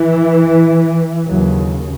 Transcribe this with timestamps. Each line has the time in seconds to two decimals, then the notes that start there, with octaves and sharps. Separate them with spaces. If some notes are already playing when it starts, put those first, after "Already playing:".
Already playing: E3
1.25 D#2 C#3 F#3